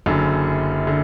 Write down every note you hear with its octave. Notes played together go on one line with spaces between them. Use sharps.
F#1 F#2 D3
D3